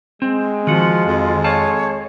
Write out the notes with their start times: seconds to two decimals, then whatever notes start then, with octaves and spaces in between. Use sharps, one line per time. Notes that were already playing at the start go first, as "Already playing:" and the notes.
0.22 G#3 C4
0.67 D#3 F3 F4 F#4
1.06 F2
1.44 C#5 F5 A5